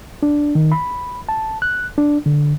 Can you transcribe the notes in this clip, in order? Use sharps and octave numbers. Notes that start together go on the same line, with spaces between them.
D4
D#3
B5
A5
F#6
D4
D3